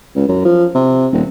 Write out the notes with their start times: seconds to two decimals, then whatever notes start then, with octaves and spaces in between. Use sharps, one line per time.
0.15 C#2
0.28 F#2
0.45 F3
0.75 C3
1.13 D#1